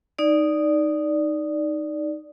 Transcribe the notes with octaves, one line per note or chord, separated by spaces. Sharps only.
D#4 D5